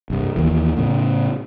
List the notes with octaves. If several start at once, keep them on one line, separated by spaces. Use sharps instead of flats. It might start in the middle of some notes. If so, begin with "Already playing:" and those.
C2 G2
D#2 E3
A2 C#3